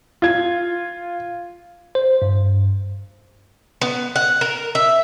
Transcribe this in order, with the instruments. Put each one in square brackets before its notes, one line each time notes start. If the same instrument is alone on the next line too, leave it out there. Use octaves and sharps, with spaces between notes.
[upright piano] F4 G#6
[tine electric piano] C5
G2
[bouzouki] B3
F#5
A#4
E5